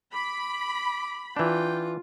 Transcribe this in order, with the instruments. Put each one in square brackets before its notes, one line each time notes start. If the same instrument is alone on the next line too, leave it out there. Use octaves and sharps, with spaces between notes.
[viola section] B5 [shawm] D6
[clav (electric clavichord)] E3 D4 [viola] F4 [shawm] G5